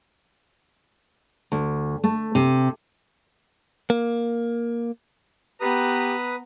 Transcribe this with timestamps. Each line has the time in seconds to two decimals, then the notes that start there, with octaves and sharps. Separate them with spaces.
1.52 D2
2.04 A3
2.35 C3
3.90 A#3
5.61 B3 G4 B4 A#5 D#6